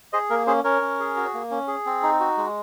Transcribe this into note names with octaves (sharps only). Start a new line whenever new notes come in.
G#4 C5 D#5
A#3 A#4
C#4 G#4 C5
C#4 A#4 C#5
C#4
G#4
F#4
A#3
C#4
G#4
C4
D#4
F#4
G#3